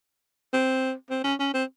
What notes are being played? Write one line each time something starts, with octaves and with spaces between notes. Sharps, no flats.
C4
C4
C#4
C#4
C4